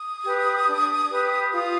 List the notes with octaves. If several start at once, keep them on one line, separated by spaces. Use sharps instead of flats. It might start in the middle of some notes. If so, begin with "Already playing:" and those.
Already playing: D#6
G4 B4
D4
G4 B4
F4 D#6